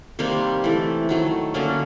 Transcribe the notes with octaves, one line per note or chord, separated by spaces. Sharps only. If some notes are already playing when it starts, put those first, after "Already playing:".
C3 D#3 G3 A#3 C4
E3 A3
D#3 F#3 A3
D3 F#3 A#3 C#4